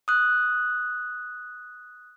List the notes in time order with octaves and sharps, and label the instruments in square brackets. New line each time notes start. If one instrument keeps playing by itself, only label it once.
[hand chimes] D#6 F#6